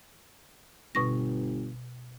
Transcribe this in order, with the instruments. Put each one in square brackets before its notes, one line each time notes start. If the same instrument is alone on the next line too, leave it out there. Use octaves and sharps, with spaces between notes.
[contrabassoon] G1 [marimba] B2 C#6 A#6